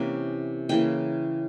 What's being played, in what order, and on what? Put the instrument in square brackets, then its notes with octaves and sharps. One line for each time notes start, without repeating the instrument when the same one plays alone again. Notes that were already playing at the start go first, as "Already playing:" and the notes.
Already playing: [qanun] C3 E3 A#3 C#4
C#3 E3 A#3 G5